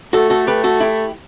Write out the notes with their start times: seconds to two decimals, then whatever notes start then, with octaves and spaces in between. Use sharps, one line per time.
0.13 A3 F#4 A4
0.30 F#4 A4
0.47 G4 B4
0.64 F#4 A4
0.80 E4 G4